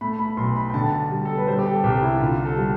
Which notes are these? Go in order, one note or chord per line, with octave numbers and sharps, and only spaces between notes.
A3 B5
B5
B1 C6
B5
G5
D3 A5
G3
A4
B4
G3 C5
G4
A4
C2 G4
E4
D3 F4
A4
G3